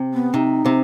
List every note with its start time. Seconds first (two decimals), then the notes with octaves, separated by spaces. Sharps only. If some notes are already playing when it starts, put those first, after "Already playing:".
Already playing: C3
0.14 B3
0.34 C3 D#4
0.66 C3